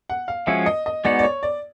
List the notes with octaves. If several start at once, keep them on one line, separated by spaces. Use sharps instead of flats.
F#5
F5
F3 G#3 C#4 F#4 E5
D#5
D#5
G#3 B3 D#4 F#4 D5
D5
C#5
D5